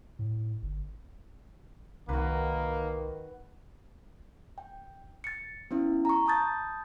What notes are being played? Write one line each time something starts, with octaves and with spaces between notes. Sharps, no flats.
A2
G1
C2 D#3 A#3 F#4 B4
G5
A6 C#7
B3 C#4 E4
A#5 C#6
A5 B5 D#6 G6 A6